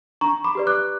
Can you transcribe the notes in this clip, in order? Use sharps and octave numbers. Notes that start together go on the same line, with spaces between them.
D4 A#5 C#6
B5 D6
G4 B4 D5
D6 F#6